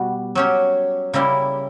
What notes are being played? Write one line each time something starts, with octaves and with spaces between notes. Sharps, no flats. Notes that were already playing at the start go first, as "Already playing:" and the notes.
Already playing: B2 G3 F#4
F#3 C#4 G4 C#5
C#3 G3 A#3 E4 G4